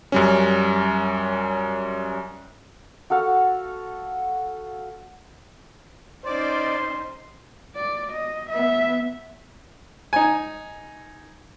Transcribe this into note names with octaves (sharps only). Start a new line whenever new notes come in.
F#2 G3 C#4
F#4 A4 F5 F#5
C#4 D#4 C5 D5 C6
D5
D#5
B3 E5
D#4 G#5